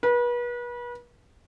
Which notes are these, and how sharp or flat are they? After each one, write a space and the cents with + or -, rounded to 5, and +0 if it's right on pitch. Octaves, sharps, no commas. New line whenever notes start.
B4 -35